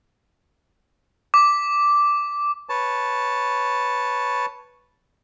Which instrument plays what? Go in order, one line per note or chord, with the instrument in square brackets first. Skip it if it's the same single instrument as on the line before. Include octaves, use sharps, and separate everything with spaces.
[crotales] D6
[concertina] B4 C#5 A5